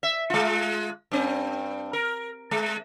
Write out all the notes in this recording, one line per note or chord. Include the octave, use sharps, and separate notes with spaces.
E5
G#3 F4
G2 C4
A#4
G#3